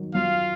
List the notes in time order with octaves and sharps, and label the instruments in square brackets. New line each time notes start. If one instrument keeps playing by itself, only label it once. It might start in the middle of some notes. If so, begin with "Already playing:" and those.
Already playing: [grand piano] D#3 F#3
[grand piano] F#3 [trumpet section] F4 F5